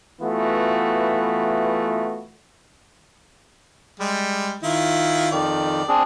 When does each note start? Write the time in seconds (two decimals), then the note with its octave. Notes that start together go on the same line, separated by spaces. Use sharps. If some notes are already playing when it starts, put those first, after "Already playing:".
0.21 E3 A3 B3 F4 F#4
4.00 G3 G#3
4.63 D#3 E4 F4
5.32 F2 D#3 D5
5.88 C4 D4 G#4